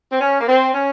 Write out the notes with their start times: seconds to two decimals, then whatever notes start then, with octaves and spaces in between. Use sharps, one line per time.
0.12 C4
0.21 C#4
0.40 A#3
0.48 C4
0.74 C#4